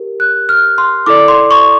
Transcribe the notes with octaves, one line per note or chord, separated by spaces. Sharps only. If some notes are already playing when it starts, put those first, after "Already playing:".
Already playing: G4 A#4
F#6
F6
C6
E4 A4 D5 D6
C6
C#6